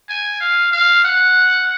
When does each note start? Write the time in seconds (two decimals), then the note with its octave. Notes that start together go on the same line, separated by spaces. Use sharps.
0.09 G#5
0.40 F5
0.73 F5
1.04 F#5